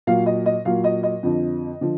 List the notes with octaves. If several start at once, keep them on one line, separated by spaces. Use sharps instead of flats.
A#2 F#3 F5
D#5
D#5
A#2 F#3 F5
D#5
D#5
F2 D3 F3
D3 F3